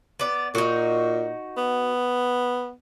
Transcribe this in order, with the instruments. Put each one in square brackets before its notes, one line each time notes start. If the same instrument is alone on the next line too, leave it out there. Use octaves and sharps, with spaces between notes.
[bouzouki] B3 D5
[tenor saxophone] A#2 [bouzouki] D#4 F#4
[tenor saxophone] B3